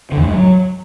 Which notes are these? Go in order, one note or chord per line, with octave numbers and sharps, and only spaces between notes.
D3
E2
A2
G#2
F#3